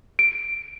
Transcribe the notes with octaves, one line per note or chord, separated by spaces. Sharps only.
D7